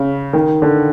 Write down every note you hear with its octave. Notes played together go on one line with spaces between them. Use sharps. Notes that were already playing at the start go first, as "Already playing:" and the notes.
Already playing: C#3
D#3
D3